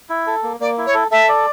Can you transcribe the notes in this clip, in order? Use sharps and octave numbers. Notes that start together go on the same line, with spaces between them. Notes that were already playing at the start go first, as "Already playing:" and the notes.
E4
A4
A#3
A#3 D5
E4
C#5
A4
A4 E5
D5